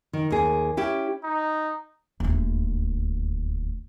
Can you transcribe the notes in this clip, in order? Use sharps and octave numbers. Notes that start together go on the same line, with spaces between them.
D#3
D#2 G#4
C#4 E4 G4
D#4
D#1 D2